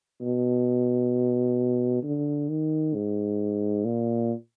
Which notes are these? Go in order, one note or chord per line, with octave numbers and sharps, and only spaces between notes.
B2
D3
D#3
G#2
A#2